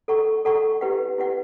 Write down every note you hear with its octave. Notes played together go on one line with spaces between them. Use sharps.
A4 D5 F#5 A#5 C#6
A4 D5 F#5 A#5 C#6
E4 G4 B4 D5 F#5
E4 G4 B4 D5 F#5